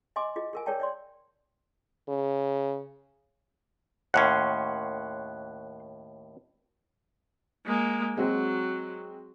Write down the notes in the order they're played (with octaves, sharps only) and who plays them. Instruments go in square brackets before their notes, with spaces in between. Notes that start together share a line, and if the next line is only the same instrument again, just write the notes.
[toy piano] D#5 G#5 C6 D6
F4 G#4 D#5
G#4 A#4 G#5
G#4 A#4 C#5 D5 G5 A5
C#5 D5 C6
[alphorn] C#3
[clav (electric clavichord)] D#2 A2 C#4 [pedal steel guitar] F#5 C6
[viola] G#3 A#3
[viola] F#3 [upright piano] G#3 C4 F#4